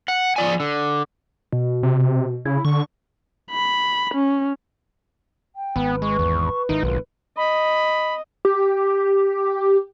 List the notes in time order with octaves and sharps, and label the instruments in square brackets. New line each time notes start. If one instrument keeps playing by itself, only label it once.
[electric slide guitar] F#5
F3 D5 G#5
D3
[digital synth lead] B2
[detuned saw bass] C3
[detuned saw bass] C#3 [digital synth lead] E4
[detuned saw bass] D3 [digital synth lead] C#6
[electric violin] B5
C#4
[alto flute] G5
[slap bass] G#1 [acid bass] B3 [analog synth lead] B4
[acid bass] G#3 [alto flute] C#6
[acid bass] E2
[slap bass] G#1 D#3 [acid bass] D#4 [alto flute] E4
[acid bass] B1 [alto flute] F4
[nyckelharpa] D#5 [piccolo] B5
[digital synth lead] G4